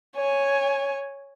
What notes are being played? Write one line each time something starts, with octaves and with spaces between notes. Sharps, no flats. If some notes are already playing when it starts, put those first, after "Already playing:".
C#5 G#5